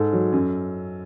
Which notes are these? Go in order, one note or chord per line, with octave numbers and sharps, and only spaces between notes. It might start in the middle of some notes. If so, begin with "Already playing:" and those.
Already playing: G#2 A4
F#3
F#2